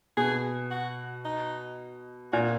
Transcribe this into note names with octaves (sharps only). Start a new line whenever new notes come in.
B2 G#4
F#4
D#4
A#2 F#4